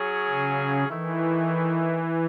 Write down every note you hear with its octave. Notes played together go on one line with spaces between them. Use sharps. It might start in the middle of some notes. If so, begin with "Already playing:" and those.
Already playing: F#3 C#4 G#4
C#3
D#3 E3 A3 E4